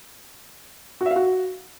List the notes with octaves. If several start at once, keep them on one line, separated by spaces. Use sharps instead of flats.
F#4
E5
F5
F#4